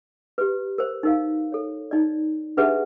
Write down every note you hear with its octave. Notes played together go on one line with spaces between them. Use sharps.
G4 B4
A#4 C5
D#4 A#4 F5
A4 C#5
D#4 D5
D4 G4 G#4 B4 E5 F#5